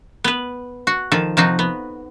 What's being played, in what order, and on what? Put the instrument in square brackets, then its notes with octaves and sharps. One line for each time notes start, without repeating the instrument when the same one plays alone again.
[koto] B3 B4
F#4
D#3 F3 A4
C3 F3 D#4 F#4
B3